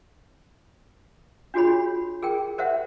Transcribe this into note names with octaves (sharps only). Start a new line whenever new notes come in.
D4 F4 F#4 G#4 C#5 B5
G#4 A#4 G5
A#4 C5 E5 F#5